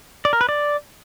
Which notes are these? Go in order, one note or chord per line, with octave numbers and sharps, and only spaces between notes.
D5
A#4
B4
D5